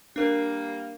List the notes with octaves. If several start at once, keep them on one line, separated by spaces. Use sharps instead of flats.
G3 A#3 D4 A#4